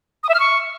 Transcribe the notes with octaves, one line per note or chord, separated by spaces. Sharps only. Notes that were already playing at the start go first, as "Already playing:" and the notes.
D#6
E5
F6
C#6